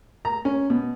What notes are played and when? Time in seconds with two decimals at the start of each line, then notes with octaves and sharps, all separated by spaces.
0.25 A#5
0.45 C#4
0.70 B2